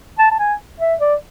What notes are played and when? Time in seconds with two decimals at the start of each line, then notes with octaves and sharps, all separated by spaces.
0.19 A5
0.31 A5
0.39 G#5
0.80 E5
1.01 D5